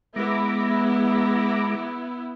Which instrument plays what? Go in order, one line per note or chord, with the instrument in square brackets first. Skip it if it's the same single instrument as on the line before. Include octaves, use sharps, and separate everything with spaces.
[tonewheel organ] G#3 A#5 D6 [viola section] B3 E4